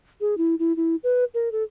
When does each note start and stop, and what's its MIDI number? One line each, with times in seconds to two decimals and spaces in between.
0.21 0.37 68
0.38 0.55 64
0.59 0.75 64
0.76 0.96 64
1.04 1.24 71
1.34 1.52 70
1.52 1.63 69